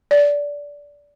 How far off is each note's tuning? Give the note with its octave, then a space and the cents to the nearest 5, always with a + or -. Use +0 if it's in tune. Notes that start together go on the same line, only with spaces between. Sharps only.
D5 -20